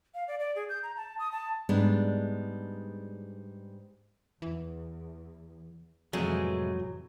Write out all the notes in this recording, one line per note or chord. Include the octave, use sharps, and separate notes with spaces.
F5
D5
D5
G#4
G6
A#5
A5
D#6
A5
G#2 G3 G#3 B3 D4
E2 E3
F2 A2 C3 E3 F#3 G#3 A3 G#4